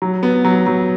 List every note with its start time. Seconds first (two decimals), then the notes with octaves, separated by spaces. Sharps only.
0.02 F#3
0.23 B3
0.45 F#3
0.67 F#3